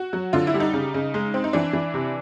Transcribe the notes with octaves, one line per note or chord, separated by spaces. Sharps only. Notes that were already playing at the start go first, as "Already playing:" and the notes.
Already playing: F#4
F#3
D3 F4
E4
G3
D#4
C#3
C#3
G#3
C4
D#4
E3 D4
E3
C3